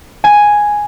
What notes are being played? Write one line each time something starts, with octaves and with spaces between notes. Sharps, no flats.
G#5